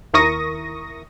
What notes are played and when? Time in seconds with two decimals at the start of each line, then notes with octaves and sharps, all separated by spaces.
0.14 D#2 E4 A#4 C#6 D#6 A#6